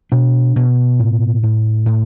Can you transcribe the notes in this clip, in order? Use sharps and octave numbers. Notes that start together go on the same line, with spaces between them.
B2 D4
B2
A2
A2
A2